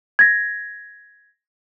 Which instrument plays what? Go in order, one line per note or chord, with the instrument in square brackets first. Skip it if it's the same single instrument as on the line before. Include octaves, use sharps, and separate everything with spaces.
[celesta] G#6 A#6